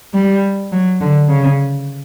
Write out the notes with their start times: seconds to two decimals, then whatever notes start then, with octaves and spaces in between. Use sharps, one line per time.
0.14 G3
0.72 F#3
1.01 D3
1.29 C#3